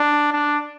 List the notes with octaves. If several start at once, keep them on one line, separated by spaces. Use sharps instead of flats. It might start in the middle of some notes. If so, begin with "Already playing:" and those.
Already playing: D4
D4